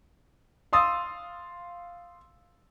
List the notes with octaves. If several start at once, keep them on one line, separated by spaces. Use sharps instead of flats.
F5 C6 D#6 E6 A6